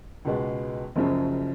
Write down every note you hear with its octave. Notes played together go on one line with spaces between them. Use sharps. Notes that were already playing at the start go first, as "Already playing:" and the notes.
C#2 B2 G#3 B3
F#1 F#2 C#3 F3